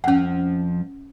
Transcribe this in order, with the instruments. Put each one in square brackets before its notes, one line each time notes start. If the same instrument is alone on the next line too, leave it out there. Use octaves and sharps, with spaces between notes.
[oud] F2 F3 [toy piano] C#4 F#5